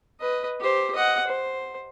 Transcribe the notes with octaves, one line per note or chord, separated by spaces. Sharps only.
B4 D#5
G4 C5
D#5 F#5
C5